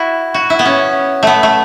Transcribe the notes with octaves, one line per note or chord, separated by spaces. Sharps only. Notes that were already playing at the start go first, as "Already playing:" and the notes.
Already playing: E4 F#4
F#4
E4
B3
C#4
A3 B3
A3